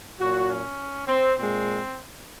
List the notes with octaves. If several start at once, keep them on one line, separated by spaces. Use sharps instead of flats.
A#2 F#3 F#4
C#4
C4
A#2 G#3 C4